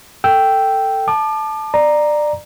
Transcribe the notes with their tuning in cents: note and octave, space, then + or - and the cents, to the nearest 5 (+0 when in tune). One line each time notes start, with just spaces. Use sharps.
A4 +20 G5 -5 E6 +0
A5 -10 D6 +35
D5 +20 A#5 +0